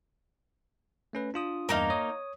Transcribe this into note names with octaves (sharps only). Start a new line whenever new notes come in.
A3 C#4 B4
D4 F4 D#6
E2 G2 A#3 D#4 F5
C#5 D#6